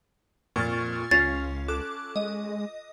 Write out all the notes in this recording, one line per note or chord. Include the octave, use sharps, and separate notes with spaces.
F2 A#2 C#6 F6 A6
C#2 C#4 F4 A6
A4 D6 F#6
G#3 D#5